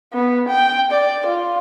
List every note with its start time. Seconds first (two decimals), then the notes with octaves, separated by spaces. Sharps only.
0.13 B3
0.48 G5
0.91 D5
1.26 F4